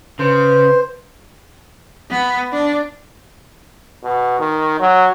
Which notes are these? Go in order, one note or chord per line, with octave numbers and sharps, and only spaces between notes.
C#3 B4 C5
B3
D4
B2
D#3
F#3